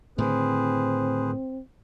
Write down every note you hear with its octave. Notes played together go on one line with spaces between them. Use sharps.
A2 D3 D#3 C4 G#4 B4 C5